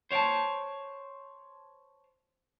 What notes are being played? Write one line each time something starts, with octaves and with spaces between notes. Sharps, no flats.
C5 C#5 F#5 G5 A5